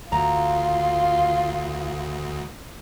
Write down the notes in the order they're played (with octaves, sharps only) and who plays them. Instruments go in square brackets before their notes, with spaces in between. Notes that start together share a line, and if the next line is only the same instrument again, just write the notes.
[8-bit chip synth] D2 [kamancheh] F4 [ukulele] A#5